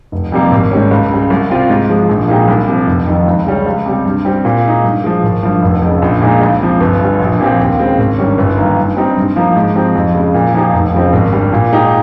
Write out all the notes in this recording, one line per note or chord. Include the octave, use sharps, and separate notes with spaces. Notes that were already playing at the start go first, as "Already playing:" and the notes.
F1
F2 C3 G3 A#3
G#1
G#2 G3 C#4
C#2
C#3 G3
C2
C3 G3 C4 F4
G#2
F3 G#3
A#1
A#2 G#3 D#4 G4
C2
C3 F3
F1
F2 D#3
C#2
C#3 G3 C#4
C#2
C3 G3
G2
G3 C4 G4
A#2
G#3 D#4
G2
F3 G#3
G#1
G2 F3
F1
F2 C#3
A#1
A#2 G#3 D#4
C#2
C3 F3
G1
G2 G3
A#1
A#2 F3 C4 G4
D#2
C#3 G#3 C4
G#1
G2 D#3 G3 C#4
G1
G2 D#3 A#3
G2
G3 C4 D#4 G4
G2
F3 A#3 D#4
G#2
F3 C4 D#4 G4
F2
C#3 G#3
A#2
F3 A#3 D#4 G4
F1
F2 C#3 F3 C4
G#1
G2 G3
A#2
G#3 D#4 G4